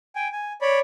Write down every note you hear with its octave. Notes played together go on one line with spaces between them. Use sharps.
G5 G#5
G#5
C#5 D5 B5